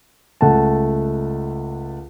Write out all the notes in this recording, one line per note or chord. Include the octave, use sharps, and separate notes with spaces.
C#2 A3 F#5 A5